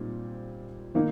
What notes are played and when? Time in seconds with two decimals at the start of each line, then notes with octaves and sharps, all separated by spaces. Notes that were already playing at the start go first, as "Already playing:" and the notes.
Already playing: A#2 G3 C4 D#4
0.95 D#3 A#3 D#4